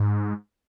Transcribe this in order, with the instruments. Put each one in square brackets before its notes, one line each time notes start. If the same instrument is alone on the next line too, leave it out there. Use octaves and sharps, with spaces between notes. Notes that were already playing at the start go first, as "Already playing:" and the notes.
Already playing: [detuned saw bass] G#2